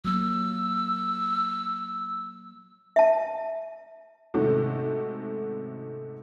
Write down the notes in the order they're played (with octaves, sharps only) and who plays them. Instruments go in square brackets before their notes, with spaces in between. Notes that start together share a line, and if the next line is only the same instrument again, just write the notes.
[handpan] F#3 A#3 [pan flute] E6
[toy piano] E5 A5
[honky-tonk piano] G#2 C3 D#3 A3 C#4 F#4